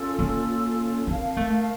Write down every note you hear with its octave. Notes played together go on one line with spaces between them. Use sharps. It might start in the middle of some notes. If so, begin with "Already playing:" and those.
Already playing: C#4 F4 A4
A#3
C4 A#4 F5 A5
A3